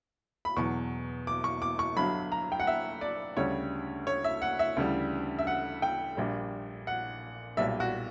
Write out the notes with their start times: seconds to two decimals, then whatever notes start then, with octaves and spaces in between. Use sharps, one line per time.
0.45 B5
0.56 E2 B2 F#3 C#6
1.27 D6
1.44 C#6
1.62 D6
1.79 C#6
1.96 G1 G2 F#3 B5
2.32 A#5
2.52 G5
2.60 F#5
2.67 E5
3.01 D5
3.37 D2 C#3 G3 C#5
4.07 C#5
4.24 E5
4.42 F#5
4.59 E5
4.77 D2 C#3 E3 G3
5.39 E5
5.47 F#5
5.82 G5
6.17 A#1 A#2 G3
6.87 F#5
7.57 B1 A#2 G3 E5
7.80 F#4